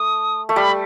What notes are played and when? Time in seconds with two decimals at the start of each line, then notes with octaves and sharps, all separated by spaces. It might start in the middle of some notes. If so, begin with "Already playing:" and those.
Already playing: A3 D#6
0.49 A3
0.56 G3 B5